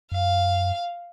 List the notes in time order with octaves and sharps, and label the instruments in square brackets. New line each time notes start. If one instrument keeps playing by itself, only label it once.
[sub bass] F#2 [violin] F5